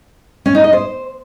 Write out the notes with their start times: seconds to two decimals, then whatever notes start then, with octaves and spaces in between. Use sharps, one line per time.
0.46 C#4
0.55 D#4
0.64 D#5
0.73 C5